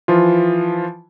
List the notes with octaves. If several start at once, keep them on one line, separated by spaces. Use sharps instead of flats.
E3 F3 F4